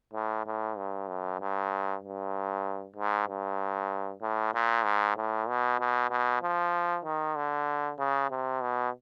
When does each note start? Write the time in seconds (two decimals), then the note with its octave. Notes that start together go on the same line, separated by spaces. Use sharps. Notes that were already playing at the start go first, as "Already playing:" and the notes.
0.14 A2
0.46 A2
0.78 G2
1.08 F#2
1.40 G2
2.03 G2
2.96 G#2
3.28 G2
4.22 A2
4.54 A#2
4.84 G#2
5.17 A2
5.48 B2
5.80 B2
6.11 B2
6.43 F3
7.04 D#3
7.36 D3
7.99 C#3
8.31 C3
8.61 B2